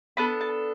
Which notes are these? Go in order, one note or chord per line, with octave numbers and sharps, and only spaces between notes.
B3 D4 A4 B5
A5